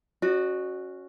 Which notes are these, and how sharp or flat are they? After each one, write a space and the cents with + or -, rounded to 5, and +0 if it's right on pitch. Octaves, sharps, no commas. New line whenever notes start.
C#4 +0 F#4 +0 D#5 -45